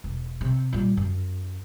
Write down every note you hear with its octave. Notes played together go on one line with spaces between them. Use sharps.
E1
C3
A#2 G3
F#2